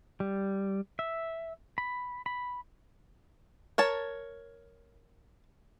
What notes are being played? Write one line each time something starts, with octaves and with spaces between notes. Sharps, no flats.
G3
E5
B5
B5
A#4 C#5 A5